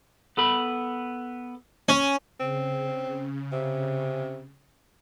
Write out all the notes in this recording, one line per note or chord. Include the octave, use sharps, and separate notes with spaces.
B3 A4 B5
C#4
C#3 C4
C3